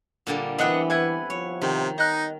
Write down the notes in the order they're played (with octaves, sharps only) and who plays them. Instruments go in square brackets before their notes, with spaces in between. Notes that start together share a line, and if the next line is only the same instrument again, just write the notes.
[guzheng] A#2 D3 G3
[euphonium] E3 [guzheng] B3 C4 [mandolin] D4 D#5 F#5
[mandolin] E4 F#5 G#5
[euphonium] F3 [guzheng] C#5
[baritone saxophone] C3 [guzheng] D#3
[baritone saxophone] D#4 [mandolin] D#5 F#6